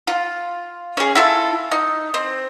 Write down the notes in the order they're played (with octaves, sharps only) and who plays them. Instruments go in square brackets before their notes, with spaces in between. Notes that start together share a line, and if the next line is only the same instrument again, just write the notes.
[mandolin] F4
C#4 G#4
E4 F4 A4
D#4
C4